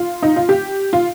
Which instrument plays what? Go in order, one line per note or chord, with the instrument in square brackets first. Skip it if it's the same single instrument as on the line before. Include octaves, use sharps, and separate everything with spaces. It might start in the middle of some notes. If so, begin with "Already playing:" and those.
Already playing: [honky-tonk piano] F4
D#4
F4
G4
F4